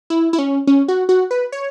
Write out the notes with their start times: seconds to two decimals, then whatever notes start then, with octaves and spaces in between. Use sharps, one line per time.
0.10 E4
0.33 E4
0.39 C#4
0.67 C#4
0.88 F#4
1.09 F#4
1.31 B4
1.52 C#5